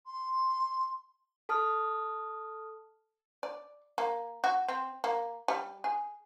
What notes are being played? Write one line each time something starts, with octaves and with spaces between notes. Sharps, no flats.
C6
A4 A5 D#6 F6
D5
A#3
F#4
C4
A#3
G3
G#4